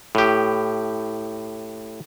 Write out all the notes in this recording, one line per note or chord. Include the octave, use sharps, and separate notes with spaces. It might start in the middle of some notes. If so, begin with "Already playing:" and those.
A2 G4